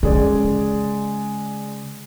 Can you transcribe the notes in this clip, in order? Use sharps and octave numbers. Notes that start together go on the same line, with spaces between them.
C#3 G#3 G#4 D5